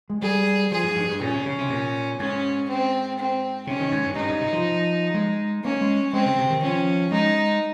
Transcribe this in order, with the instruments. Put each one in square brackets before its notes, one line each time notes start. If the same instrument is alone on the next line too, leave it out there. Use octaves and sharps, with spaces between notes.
[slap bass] G#3
[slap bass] G3 [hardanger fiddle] G#4
[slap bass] F3 [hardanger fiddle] G#4
[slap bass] G#2
G2
G2
[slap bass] A#2 [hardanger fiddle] C#4
[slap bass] C3
C#3
C3
A#2
[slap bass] G#2 [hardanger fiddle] C#4
[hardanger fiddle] C4
C4
[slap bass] C3 [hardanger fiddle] C#4
[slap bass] D#3
G#2
G2
[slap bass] G2 [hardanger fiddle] D#4
[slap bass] G#2
C3
F3
G#3
[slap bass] A#3 [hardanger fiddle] C#4
[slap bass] G#3
[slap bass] G#3 [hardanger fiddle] C4
[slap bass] C#3
C3
D#3
[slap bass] F3 [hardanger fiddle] C#4
[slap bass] G#3 [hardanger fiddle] D#4